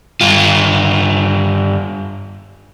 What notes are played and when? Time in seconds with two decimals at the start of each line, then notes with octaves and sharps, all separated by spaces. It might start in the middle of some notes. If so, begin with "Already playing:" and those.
0.21 G2 F4